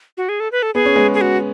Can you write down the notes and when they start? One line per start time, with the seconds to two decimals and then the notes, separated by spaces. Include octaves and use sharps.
0.17 F#4
0.29 G#4
0.40 A4
0.52 B4
0.62 A4
0.74 B3 G#4
0.85 C#4
0.96 G#3 B3
1.14 G#4
1.21 F#4